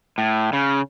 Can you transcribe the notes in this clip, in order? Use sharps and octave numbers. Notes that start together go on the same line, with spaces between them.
A2
C#3